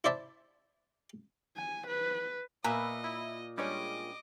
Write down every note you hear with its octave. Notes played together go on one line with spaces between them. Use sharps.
E4 C5 D5 E5 A5
G#5
B4
A#2 B4 D#5 E5 G#5 A#5
E4
G3 G#3 C#4 D4 G4 C#5 D#5 D6